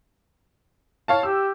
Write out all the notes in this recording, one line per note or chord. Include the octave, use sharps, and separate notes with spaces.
C#5 F5 A5
G4 E6